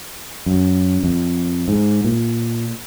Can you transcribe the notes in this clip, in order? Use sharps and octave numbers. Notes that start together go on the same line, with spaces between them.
F#2
F2
G#2
A#2